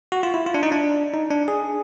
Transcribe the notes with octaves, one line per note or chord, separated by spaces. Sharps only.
F#4
F4
E4
F4
D4
D#4
D4
D#4
D4
G#4